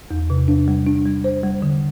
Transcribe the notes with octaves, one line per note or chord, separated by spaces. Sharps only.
E2
C3
D4
G3
D4
G3
C5
G3
D3